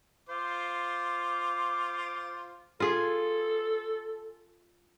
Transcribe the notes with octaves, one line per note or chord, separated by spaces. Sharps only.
F4 C5 D6
F4 G#4 A4